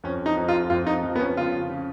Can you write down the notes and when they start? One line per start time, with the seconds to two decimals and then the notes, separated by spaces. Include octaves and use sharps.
0.04 F2 C#4
0.26 D#4
0.37 F2
0.48 F4
0.70 F2 F4
0.87 D#4
1.03 F2
1.16 B3
1.20 C#4
1.37 C#3 F4
1.70 C#3